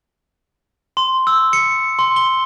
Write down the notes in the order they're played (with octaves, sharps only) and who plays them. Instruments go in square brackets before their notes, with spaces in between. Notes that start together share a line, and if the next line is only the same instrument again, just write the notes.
[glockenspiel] C6
E6
C#7
C6
G7